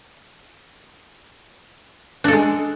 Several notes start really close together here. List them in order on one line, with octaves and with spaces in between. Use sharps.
D4 A4 G#3